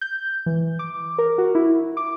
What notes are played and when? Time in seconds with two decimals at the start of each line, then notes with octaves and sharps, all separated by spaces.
0.01 G6
0.46 E3
0.79 D6
1.18 A#4
1.38 F#4
1.55 E4
1.97 D6